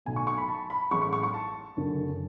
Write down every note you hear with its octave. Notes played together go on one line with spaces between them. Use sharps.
B1 B2 A3 G#5
C#6
C#6
B5
A5
B5
A1 A2 G#3 C#6
C#6
C#6
C#6
A5
F#1 F#2 D3